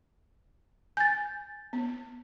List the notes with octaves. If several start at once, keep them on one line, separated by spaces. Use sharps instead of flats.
G#5 G6 A6
B3